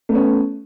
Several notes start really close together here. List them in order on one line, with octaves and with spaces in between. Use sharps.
A3 B3 C#4